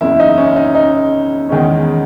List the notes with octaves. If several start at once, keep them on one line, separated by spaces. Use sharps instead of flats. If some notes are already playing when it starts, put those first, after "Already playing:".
F#1 E2 C#3 E4
D#4
C#4
D#4
D#4
E2 D#3 G#3 C#4